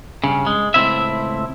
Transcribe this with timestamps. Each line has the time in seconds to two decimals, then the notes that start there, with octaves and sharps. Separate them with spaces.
0.24 G2 C#3
0.47 G#3
0.74 C#2 A2 C#3 C4 E4 E5